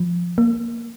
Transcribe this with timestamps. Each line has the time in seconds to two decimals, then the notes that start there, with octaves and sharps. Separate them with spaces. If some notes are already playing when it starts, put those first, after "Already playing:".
Already playing: F3
0.38 A#3